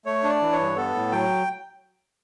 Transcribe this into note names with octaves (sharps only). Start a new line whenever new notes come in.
A3 C#5
D4
D5
E3
C#5
G2
B3 A4
A2
F#3 G5